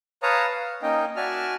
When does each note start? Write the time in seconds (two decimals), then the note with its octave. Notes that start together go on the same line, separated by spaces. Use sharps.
0.23 B4 C#5 F5 A5 A#5 D#6
0.51 F5
0.82 A#3 C#4 D#4 D#5 G5
1.16 F#4 D5 E5 G#5 A5 F6